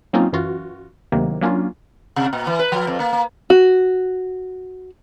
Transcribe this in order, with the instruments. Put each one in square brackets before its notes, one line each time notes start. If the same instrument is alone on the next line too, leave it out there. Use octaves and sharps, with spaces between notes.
[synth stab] F#3 A#3 C4 C#4 D#4 F4
F#2 E3 F4 F#4
D2 C3 D#3 F#3 A#3
F#3 A#3 C#4 D4 F4
[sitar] C3
A#2
E3
B4
F3
F2
A#3
A#3
[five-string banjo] F#4